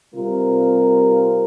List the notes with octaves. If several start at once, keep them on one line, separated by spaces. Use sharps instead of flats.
C3 G3 C4 F4 A#4